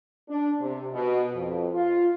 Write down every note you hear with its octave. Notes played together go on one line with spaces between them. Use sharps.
D4
C3
B2
F2
F4